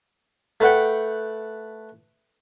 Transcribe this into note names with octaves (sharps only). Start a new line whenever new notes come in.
A3 B4 F#5 G5